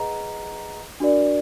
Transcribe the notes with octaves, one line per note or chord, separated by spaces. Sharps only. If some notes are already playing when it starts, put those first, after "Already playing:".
Already playing: G#4 B4 D#5 F#5 A#5
D4 F#4 A#4 D5